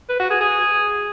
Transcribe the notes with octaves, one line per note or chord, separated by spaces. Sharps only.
B4
F#4
G#4
G#4